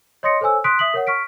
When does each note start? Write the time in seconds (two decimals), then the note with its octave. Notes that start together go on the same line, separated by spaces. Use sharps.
0.23 C#5 D#5 C6 D#6 A#6 C#7
0.41 A4 C5 C#5 G#5 E6
0.64 C6 D#6 F#6 B6 D7
0.79 E5 D#6 B6 F#7
0.94 A#4 C#5 F#5
1.07 C#6 F6 B6 D7